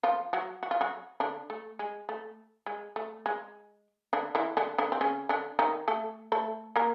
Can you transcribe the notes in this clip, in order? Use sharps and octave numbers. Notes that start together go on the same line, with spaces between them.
F3 F4
F#3 F#4
F#4
F4
F#3 F#4
D3 D4
A3
G#3
A3
G#3
A3
G#3
D3 D4
E3 E4
D3 D4
D3 D4
C4
C#3 C#4
D3 D4
D#3 D#4
A3 A4
A3 A4
A#3 A#4